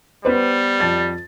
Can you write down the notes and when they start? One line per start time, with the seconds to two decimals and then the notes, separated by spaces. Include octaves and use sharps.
0.25 G3 B3 B4 C5
0.80 F2 A5 A6